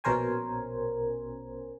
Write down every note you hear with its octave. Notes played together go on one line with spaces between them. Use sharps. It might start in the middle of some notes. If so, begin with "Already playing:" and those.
A#1 B2 C#4 A#4 C5 G#5